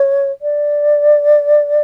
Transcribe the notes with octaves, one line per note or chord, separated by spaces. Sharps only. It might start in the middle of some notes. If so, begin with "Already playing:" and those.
Already playing: C#5
D5